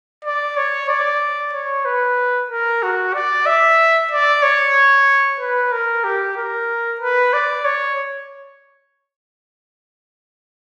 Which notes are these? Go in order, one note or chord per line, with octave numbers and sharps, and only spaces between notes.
D5
C#5
D5
C#5
B4
A#4
F#4
D5
E5
D5
C#5
B4
A#4
G4
A#4
B4
D5
C#5